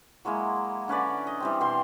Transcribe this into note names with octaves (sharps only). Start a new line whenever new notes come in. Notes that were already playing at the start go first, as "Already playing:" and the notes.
F#3 G#3 A#3 E4
D3 C#4 B4 D5
D#5
E3 G3 C4
B2 C4 A#4 C6